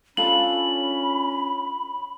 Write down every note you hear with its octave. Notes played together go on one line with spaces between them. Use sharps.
C#4 D4 F4 A4 B5 F#7